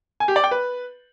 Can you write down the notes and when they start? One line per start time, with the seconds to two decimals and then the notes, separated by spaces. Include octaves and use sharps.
0.20 G#5
0.28 G4
0.36 D5
0.44 G5
0.51 B4